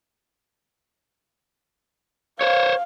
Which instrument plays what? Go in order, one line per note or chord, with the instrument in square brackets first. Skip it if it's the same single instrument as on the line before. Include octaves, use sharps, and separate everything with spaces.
[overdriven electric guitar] C5 C#5 [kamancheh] F5